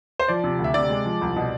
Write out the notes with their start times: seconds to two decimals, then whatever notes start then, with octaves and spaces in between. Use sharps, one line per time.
0.19 C5
0.28 F3 D5
0.44 C3
0.59 D2
0.64 E5
0.74 C3 D5
0.90 G#3
1.05 F3
1.21 C2
1.36 B2